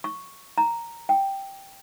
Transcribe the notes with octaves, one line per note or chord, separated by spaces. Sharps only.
C#6
A#5
G5